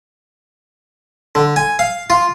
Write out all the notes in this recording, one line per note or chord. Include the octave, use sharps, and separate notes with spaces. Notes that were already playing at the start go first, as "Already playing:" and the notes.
D3
G#5
F5
F4